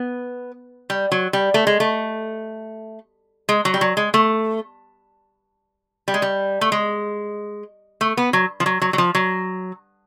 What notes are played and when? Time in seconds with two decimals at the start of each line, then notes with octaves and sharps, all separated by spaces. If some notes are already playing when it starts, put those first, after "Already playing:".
Already playing: B3
0.90 G3
1.12 F#3
1.33 G3
1.54 A3
1.67 G#3
1.80 A3
3.49 G#3
3.65 F#3
3.74 G3
3.81 F#3
3.97 G#3
4.14 A3
6.08 G3
6.14 G#3
6.22 G3
6.61 A3
6.72 G#3
8.01 A3
8.17 B3
8.33 F#3
8.60 F3
8.66 F#3
8.82 F#3
8.93 F#3
8.98 F3
9.15 F#3